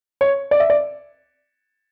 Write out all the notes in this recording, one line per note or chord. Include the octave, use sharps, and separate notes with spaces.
C#5
D5
E5
D5